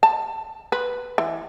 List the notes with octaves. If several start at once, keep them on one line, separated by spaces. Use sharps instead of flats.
A5
B4
E3